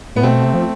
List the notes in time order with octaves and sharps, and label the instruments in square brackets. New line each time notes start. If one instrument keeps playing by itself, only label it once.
[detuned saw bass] A2 [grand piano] B3
[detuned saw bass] B2 [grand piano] A3 C4
[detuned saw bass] C3
F3